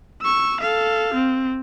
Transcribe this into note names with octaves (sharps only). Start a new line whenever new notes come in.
C#6 E6
A4 F5
C4